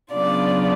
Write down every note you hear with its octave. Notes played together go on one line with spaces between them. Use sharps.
C#3 F#3 B3 D4 F4 D5